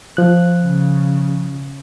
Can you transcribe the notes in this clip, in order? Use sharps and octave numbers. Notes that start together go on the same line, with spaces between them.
F3 F#6
C#3